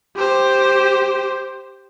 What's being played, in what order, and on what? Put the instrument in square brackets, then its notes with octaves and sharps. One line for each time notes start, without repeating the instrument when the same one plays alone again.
[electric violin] G4 C5